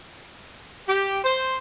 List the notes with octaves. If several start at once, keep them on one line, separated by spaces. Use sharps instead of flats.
G4
C5